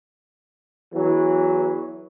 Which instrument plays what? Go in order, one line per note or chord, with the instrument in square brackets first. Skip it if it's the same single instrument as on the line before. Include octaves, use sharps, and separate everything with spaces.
[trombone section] E2 E3 F#3